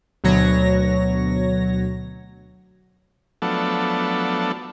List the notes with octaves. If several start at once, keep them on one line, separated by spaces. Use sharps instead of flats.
D2 B2 F#3 C#5 A#6
F3 F#3 A3 B3 D4 A4